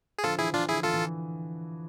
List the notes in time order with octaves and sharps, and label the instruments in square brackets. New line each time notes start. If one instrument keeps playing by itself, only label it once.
[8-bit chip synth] G#4
[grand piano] D3 F3 [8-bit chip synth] F4 A4
[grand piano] E3 [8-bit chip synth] E4 G#4
[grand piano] E3 [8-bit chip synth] D4 F4
[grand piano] D3 [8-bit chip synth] E4 G#4
[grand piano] E3 [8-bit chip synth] F4 A4
[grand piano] E3